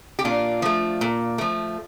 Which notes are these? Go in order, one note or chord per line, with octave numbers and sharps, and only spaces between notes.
G4
A#2 D4 F4
F3 A3
A#2
F3 A3